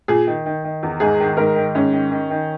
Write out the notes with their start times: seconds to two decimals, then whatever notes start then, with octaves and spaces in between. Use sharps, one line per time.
0.08 A#2 G#4
0.27 D#3
0.46 D#3
0.64 D#3
0.83 E2
1.00 G#2 G#4
1.20 D#3
1.37 G#2 A#4
1.55 D#3
1.75 G#2 C#4
1.93 D#3
2.11 D#3
2.30 D#3